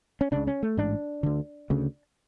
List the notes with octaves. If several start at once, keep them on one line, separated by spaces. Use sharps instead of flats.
C#4
C#2 C#3 D4
C#4
A3
A1 G#2 D4
D2 D3
D2 C#3